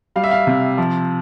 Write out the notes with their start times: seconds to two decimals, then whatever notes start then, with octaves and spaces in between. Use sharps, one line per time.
0.16 G3 F5
0.24 E5
0.31 F5
0.47 C3
0.78 F3